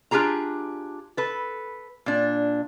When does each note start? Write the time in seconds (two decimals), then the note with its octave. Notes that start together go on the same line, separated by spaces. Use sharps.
0.11 D4 F4 G4 G#4 A#5
1.17 A4 B4
2.06 A#2 D4